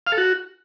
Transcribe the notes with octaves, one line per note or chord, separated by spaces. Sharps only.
F5
A4
F#4